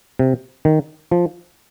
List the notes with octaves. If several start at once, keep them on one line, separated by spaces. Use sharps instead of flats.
C3
D#3
F3